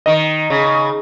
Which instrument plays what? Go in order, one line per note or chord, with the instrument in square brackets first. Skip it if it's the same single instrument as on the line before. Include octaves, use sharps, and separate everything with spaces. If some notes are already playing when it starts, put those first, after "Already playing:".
[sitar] D#3 [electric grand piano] D#5
[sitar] C#3